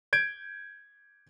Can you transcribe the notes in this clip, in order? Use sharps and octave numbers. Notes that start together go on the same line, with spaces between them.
G6 G#6 D7